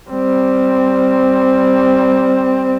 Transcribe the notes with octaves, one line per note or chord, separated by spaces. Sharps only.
G3 C4